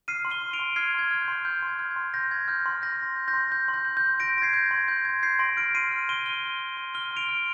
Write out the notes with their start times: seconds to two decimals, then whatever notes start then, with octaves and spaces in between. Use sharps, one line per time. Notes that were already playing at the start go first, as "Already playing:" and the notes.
0.08 F6 C7 D#7
0.25 C6
0.30 D#7 G7
0.42 F6
0.53 D7 F7
0.59 C6
0.76 F6 G#6 C7
0.94 C6 G#6
1.11 F6
1.22 G6
1.28 C6
1.45 F6 G6
1.62 C6
1.68 G#6
1.79 F6
1.91 G#6
1.96 C6
2.14 F6 G6 A#6
2.31 C6 G#6
2.48 F6 G6
2.66 C6
2.82 G6 A#6
2.99 C6
3.16 G6
3.28 G6 A#6
3.34 C6
3.52 G6
3.68 C6
3.74 G6
3.85 G6
3.97 G6
4.02 C6
4.20 G6 A#6 D7
4.37 C6 A#6
4.42 G#6 C7
4.53 G6
4.66 C6 G#6
4.88 G6 G#6
5.05 C6 G#6
5.23 G6 G#6 C7
5.39 C6 A#6 D7
5.57 F6 A#6 D7
5.75 C6 C7 D#7
5.91 F6
6.09 C6 D#7 G7
6.25 F6 D#7 G7
6.43 C6
6.60 F6
6.77 C6
6.94 F6 D#7 G7
7.11 C6
7.17 D7 F7
7.29 F6